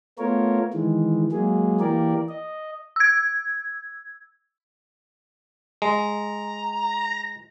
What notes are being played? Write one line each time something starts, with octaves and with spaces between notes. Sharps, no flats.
A3 B3 F4 A#4 C#5
D#3 E3 G#3
F#3 G#3 A#3 G#4
E3 A#3 G4 A#4 D5
D#5
E6 G#6
G#3 A#5